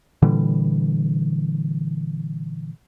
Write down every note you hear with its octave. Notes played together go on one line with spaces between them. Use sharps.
A#2 D3 E3 G3